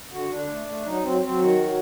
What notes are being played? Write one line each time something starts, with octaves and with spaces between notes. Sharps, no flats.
D3 F#4
D3 D4
A3
A3
F#3 D#4
F#3 C4
F#3 C4
D#3 F#4
F#3